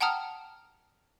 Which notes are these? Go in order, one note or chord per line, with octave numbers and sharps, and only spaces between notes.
F#5 G5 A5 A#5 D#6 F6